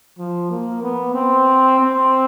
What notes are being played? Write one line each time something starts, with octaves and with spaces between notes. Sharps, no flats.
F3
A#3
B3
C4
C4